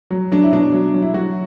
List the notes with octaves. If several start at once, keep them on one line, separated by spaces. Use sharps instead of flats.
F#3
F#3 D4
E4
B2 D4
F#3
F#3
E4
F#3 F#4